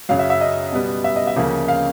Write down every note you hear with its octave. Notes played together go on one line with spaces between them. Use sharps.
F#2 C#3 F#3 F5
E5
E5
D#5
B2 G3 B3
E5
D#5
E5
D2 C#3 F3 A#3
F5